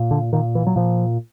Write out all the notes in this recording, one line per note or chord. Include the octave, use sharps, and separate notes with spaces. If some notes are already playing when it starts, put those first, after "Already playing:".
Already playing: A#2
D3
A#2 D#3
E3
F#3
A#2 F3